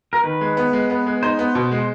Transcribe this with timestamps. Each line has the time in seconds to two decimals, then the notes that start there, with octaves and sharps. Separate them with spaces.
0.13 A#4
0.24 D#3 B4
0.41 G#3
0.57 B3
0.73 G#3
0.90 B3
1.06 G#3
1.23 D#4 C5
1.37 B3 C5
1.55 B2
1.72 G#3